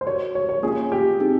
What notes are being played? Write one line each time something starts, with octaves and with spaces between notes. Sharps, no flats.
C5
F#4 A#4 C#5 D5
C#5
C#5
A#3 C#4 F4 G#4
G4
C4 D#4 G#4